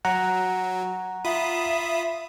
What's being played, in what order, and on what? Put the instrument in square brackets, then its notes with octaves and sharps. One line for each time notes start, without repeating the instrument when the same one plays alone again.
[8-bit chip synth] F#3 [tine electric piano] F#5 A#5
[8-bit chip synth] F4 B5 D#6 [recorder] E5